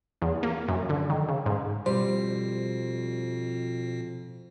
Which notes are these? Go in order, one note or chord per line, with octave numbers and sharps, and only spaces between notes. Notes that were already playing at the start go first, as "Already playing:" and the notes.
E2
A#3
F#2
D3
D#3
C#3
G#2
F2 B2 G3 C5